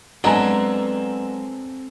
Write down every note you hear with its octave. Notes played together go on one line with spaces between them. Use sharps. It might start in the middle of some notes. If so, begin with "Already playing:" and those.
F#3 G#3 B3 C4 D4 A4 G#5 A#5